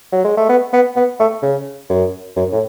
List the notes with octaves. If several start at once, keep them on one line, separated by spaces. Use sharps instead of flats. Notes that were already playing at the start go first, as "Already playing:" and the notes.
F#3
G#3
A3
B3
B3
B3
A3
C#3
F#2
F#2
A2